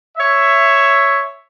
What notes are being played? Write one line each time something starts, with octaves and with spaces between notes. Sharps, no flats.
C#5 E5